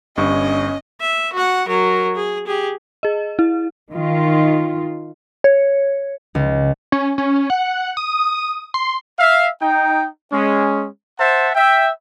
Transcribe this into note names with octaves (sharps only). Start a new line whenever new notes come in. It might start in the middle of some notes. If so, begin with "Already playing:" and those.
G1 G2 C#4 D#5 C#6
E5
F#4 F#5
F#3 A#4
G#4
G4 G#4
G#4 D#5
E4
D#3 F4
C#5
C#2
C#4
C#4
F#5
D#6
C6
E5 F5
D#4 G5
G#3 C#4
C5 E5 F#5 A5
E5 G5